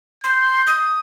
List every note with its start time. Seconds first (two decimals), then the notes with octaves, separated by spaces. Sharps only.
0.24 C6 G6
0.67 D#6